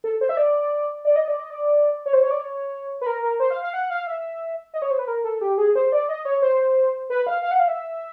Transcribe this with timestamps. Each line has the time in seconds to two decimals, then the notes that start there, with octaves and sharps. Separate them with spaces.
0.04 A4
0.21 C5
0.29 E5
0.37 D5
1.05 D5
1.16 D#5
1.28 D5
1.40 D#5
1.50 D5
2.06 C#5
2.13 C5
2.22 C#5
2.31 D5
2.39 C#5
3.01 B4
3.07 A#4
3.23 A#4
3.40 C5
3.50 F5
3.62 F5
3.73 F#5
3.90 F5
4.07 E5
4.74 D#5
4.82 C#5
4.91 C5
4.99 B4
5.08 A#4
5.24 A4
5.41 G4
5.58 G#4
5.75 C5
5.92 D5
6.09 D#5
6.25 C#5
6.42 C5
7.10 B4
7.27 F5
7.43 F5
7.51 F#5
7.60 F5
7.68 E5